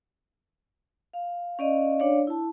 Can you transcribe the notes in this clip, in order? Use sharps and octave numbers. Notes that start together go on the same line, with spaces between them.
F5
C#4 D5 D#5 F5
D4 C#5 D5 F5
E4 A5